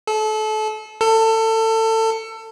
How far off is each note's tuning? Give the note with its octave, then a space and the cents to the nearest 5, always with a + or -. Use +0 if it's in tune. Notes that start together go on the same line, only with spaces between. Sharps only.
A4 -30
A4 +25